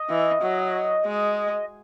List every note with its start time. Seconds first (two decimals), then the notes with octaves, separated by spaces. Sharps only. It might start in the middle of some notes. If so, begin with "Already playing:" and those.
Already playing: D#5
0.09 E3
0.42 F#3
1.05 G#3